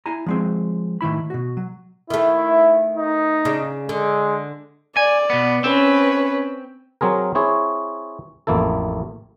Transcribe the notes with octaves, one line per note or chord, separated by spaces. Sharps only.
E4 G#5 A#5
F3 G#3 C4
A2 D#3 E4 B5
B2 F#4
F#3
D#3 A3 E4
D#4
C#3 D4
D3 G#3
D5 G#5
B2 B3
C4 C#4 B4
F#3 C4 G#4 A#4
C4 E4 G#4 C#5
A1 F2 A#3 E4 A4